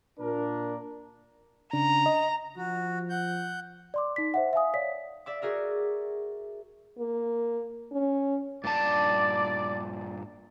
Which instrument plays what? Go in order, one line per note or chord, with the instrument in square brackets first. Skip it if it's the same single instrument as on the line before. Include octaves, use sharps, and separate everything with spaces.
[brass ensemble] A#2 D4 A#4
[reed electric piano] C#3 D4 [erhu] A#5
[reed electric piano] D#5
[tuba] F3 [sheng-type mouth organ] F#4
[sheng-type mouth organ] F#5 G6
[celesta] D5 C6 D6
D#4 B6
C5 E5 F#5
E5 F5 G#5 D#6
C#5 D5 F5 B6
[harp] D5 E5 D6
F#4 G#4 A#4 E5
[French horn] A#3
C#4
[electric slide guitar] G2 A#2 A5 [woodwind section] D5